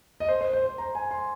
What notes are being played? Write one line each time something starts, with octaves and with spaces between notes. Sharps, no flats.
D#5
C5
C5
C5
C5
A#5
G#5
C6